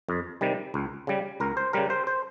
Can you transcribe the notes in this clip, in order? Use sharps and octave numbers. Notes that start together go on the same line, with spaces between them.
F2
C3 D#3 G3
C#2
C#3 G3
C#2 A#4
C5
C#3 G3 A#4
C5
C5